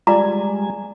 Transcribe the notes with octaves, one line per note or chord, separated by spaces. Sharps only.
G3 G#3 F4 D5 G#5 A#5